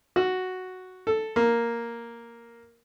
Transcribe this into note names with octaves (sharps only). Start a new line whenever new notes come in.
F#4
A4
A#3